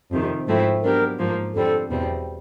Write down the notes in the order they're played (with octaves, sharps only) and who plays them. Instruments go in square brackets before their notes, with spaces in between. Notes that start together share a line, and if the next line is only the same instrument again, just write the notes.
[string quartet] F2 C3 D#3
G#2 F3 A3 C4 E4
[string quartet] F#3 B3 D4 G4 [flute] A#4
[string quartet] G#2 F3 A#3
[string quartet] F2 D3 G3 C4 [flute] A4
[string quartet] E2 B2 G3 C4